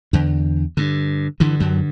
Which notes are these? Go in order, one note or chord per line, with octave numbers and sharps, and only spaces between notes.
E2 D3
G2 D3
G2 D3 E3
F#2 F#3